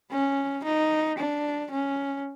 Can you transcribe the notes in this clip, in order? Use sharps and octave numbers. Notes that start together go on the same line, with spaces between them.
C#4
D#4
D4
C#4